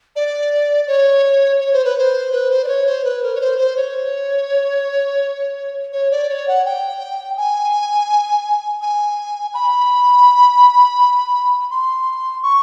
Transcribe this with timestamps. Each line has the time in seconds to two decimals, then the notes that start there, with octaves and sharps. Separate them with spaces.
0.16 D5
0.87 C#5
1.60 C#5
1.73 C5
1.85 B4
1.98 C5
2.32 B4
2.51 C5
2.64 D5
2.68 C#5
2.86 C5
3.04 B4
3.23 A#4
3.35 C#5
3.41 C5
3.58 C5
3.77 C#5
5.93 C#5
6.11 D5
6.29 C#5
6.48 F#5
6.65 G5
7.37 G#5
8.82 G#5
9.54 B5
11.71 C6
12.43 C#6